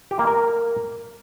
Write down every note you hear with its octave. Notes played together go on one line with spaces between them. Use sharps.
G4
A#3
A#4